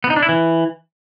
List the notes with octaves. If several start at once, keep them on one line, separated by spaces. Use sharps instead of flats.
B3
D#4
D4
E4
E3